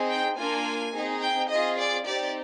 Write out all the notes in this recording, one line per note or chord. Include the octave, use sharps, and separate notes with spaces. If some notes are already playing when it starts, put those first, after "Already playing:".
Already playing: C4 D#4 G#4
G5
A#3 D4 F4 G#5
C4 D#4 G#4
G5
C4 F4 G#4 D#5
D5
C4 D#4 G4 D5